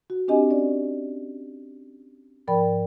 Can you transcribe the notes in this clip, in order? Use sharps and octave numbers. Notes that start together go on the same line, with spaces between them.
F#4
C4 D4 G4 D#5 G#5
C#4 D5
G#2 F3 A#4 D5 G5 B5